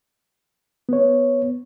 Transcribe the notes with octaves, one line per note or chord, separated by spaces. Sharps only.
B3 C#5